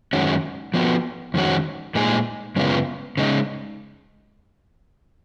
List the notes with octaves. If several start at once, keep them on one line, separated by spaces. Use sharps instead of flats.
F#2 D#3 G#3 C#4 F#4
F3 B3 F#4
F2 D#3 G#3 C#4 F#4
A#2 G#3 D#4 G#4
F#2 C#3 G#3 B3 F4
C#3 G#3 D#4